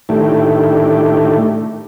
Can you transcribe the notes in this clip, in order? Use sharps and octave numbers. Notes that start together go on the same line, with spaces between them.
A2 D#3 A3 D4 E4 G4